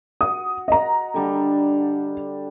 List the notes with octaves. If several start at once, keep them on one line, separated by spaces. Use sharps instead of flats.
F#4 D#6
D#5 A#5
D3 G3 D4